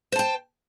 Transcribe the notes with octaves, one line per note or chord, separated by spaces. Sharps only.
C5 G5 A5